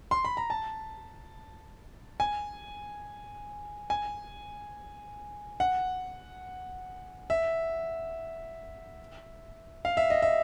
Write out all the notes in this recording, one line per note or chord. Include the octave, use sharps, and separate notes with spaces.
C6
B5
A#5
A5
G#5
G#5
F#5
E5
F5
E5
D#5
E5